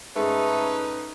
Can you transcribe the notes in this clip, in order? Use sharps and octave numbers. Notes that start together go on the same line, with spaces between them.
G#2 A3 C#4 D#4 B4